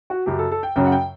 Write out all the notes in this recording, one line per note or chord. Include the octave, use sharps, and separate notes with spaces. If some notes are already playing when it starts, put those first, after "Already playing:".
F#4
F#2 C#3 F#3 G4
A4
A4
G5
F#2 C#3 F#3 G5
F#5
G5